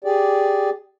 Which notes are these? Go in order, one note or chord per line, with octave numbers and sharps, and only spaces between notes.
G4 G#4 D5